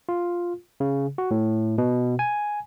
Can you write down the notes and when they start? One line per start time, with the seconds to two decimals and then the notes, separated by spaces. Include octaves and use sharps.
0.09 F4
0.80 C#3
1.18 F#4
1.31 A2
1.78 B2
2.19 G#5